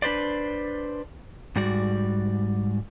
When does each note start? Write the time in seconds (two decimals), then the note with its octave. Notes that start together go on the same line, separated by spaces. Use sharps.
0.02 D4 B4 C5 D5
1.56 G#2 G3 F#4 D5